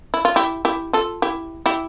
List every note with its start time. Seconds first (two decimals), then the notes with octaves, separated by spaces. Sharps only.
0.14 E4
0.25 F4
0.36 E4 G4
0.65 E4 G4
0.93 F4 A4
1.22 E4 G4
1.66 E4 G4